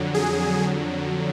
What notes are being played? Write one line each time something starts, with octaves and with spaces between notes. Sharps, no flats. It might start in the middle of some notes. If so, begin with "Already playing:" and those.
Already playing: F2 D3 F#3
G#4